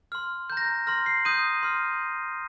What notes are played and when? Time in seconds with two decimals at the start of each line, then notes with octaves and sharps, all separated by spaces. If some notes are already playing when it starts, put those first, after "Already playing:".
0.12 C6 F6
0.50 A#5 G6
0.57 A#6
0.64 G6
0.87 C6 F6 A#6
1.06 C7
1.25 C6 D#6 G6 D#7
1.63 C6 F6